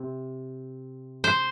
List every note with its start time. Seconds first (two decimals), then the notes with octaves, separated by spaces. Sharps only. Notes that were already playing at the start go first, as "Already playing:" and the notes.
Already playing: C3
1.24 C5